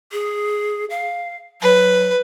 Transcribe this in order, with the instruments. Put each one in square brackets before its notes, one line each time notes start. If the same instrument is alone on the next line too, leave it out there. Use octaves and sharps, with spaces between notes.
[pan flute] G#4
F5
[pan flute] F#3 [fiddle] B4